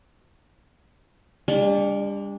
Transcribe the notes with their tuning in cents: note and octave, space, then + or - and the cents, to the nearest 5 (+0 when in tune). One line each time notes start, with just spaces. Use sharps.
G3 +40 D4 -15